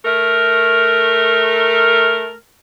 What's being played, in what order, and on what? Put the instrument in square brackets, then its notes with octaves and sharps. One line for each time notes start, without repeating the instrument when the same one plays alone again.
[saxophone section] A3 A#4